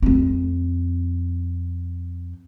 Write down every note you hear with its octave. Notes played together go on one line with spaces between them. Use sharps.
F2 C4